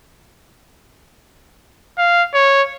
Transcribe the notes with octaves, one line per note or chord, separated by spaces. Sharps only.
F5
C#5